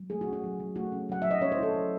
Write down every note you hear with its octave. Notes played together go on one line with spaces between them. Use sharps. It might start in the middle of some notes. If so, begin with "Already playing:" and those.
Already playing: F#3
A3 G#4
F#4
C#4
F#4
F#3
F#3
A3 F#4
C#4
F#3 F#5
F#3 E5
D#5
C#4 C#5
C5
E4 A4
F#3